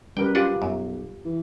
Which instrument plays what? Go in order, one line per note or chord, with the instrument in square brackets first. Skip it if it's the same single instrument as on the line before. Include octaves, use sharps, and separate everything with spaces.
[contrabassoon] F#2 [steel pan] G3 A#4 B4 [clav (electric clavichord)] G5
[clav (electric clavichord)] D4 B4 F#5 [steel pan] F4 G4
[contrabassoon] B1 [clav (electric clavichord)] F#2
[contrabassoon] E3